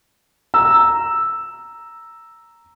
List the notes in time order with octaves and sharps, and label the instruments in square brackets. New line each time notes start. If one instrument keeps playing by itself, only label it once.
[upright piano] A#5 E6